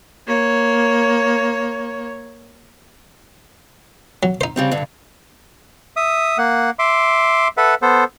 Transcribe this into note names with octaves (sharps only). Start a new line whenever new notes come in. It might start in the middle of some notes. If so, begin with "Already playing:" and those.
A#3 C#5
F#3
D#4 C5
C#3 G3 C4
G2 D3
E5 D#6
A#3 F#5
E5 C6 D6
A4 B4 E5 F#5
B3 A4 C5